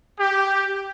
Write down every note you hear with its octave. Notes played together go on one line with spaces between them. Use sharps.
G4